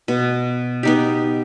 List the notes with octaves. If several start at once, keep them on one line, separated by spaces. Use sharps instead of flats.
B2
B3 D#4 G4